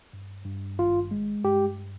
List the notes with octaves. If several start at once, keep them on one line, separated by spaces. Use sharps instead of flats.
G2
G2
G#1 F4
G#3
G2 G4